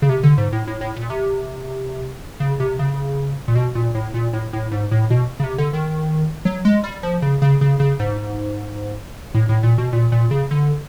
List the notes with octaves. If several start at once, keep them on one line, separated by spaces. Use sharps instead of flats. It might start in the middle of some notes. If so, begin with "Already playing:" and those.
C#3
C3
D3
G#2
A2
A2
A2
A#2
C3
C#3
C3
C#3
A#2
B2
A#2
A2
A#2
A2
A2
G#2
A2
B2
C#3
C3
D3
D#3
F#3
G#3
G3
F3
C#3
C#3
C#3
C#3
G#2
A2
A2
A#2
B2
A#2
A#2
C#3
D3